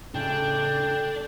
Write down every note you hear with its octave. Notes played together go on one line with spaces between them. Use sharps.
A2 C#3 D4 A4 G5